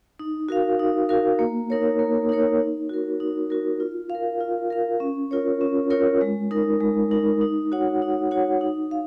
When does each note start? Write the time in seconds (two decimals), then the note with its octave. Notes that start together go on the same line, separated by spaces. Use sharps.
0.19 D#4
0.49 F#4 A#4 F5
0.80 D#4
1.09 F#4 A#4 F5
1.39 A#3
1.70 D#4 A#4 C#5
1.99 A#3
2.29 D#4 A#4 C#5
2.59 D#4
2.89 F#4 A#4
3.20 D#4
3.50 F#4 A#4
3.80 F4
4.10 F5
4.15 A#4
4.40 F4
4.70 A#4 F5
5.00 C#4
5.31 F4 A#4 C#5
5.61 C#4
5.90 F4 A#4 C#5
6.21 G#3
6.51 D#4 A#4
6.80 G#3
7.11 D#4 A#4
7.41 D#4
7.72 F#4 C#5 F#5
8.02 D#4
8.31 F#4 C#5 F#5
8.61 D#4
8.91 F5